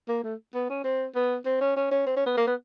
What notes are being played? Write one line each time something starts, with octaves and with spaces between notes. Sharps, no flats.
A#3
A3
B3
C#4
C4
B3
C4
C#4
C#4
C#4
C4
C#4
B3
A#3
B3